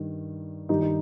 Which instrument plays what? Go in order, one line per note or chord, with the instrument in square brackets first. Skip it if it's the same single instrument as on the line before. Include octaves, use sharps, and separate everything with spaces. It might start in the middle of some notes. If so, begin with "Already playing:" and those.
Already playing: [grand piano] G2 D#3
G2 D#3 D#4 G4
D#4